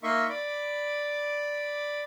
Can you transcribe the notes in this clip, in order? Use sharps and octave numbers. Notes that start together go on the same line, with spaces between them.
A#3 D#4 D#5 E5 C6 C#6
D5 B5 D6